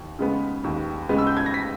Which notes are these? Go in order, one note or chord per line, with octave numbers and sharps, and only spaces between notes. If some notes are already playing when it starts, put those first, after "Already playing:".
Already playing: D#2
C#3 G#3 B3
D#2
C#3 G#3 B3
E6
G6
G#6
A#6
B6